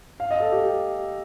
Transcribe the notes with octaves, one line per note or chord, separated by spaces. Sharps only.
F5
D#5
A4
G4